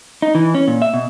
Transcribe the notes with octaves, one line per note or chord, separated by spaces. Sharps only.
D#4
E3
C#4
A#2
E5
B2